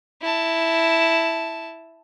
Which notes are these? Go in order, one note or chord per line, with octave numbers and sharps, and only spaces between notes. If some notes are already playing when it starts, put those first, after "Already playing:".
E4 A5